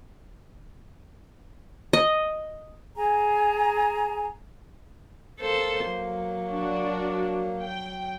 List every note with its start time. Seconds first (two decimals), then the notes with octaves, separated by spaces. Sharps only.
1.93 D#5
2.96 G#4 G#5 A#5
5.40 A#3 A4 C5
5.90 F#3
6.48 D4 F#4
7.62 G5